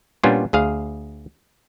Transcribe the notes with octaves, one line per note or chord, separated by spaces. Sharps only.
A#2 G3 B3 C#4 D4 F4
D2 G#4 F5